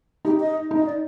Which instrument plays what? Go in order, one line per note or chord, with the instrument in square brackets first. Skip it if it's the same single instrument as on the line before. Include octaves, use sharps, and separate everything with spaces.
[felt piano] D#4 [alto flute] G4
[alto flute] D#5
[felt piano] D#4
[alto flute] D#5
D5